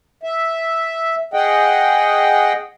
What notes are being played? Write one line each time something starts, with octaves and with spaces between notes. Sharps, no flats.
E5
G#4 D#5 F#5 G5